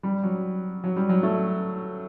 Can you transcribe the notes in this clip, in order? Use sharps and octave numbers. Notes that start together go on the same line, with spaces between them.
G3
F#3
F#3
G3
F#3
A3